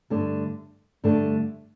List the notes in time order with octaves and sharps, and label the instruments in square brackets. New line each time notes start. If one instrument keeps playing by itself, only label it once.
[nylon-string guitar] G2 D3 A3 D4
G2 D3 A3 D4